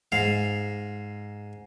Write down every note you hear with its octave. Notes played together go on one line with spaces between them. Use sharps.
G#2 F5